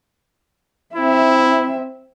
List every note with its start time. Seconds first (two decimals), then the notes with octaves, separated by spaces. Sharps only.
0.96 C4 E4 E5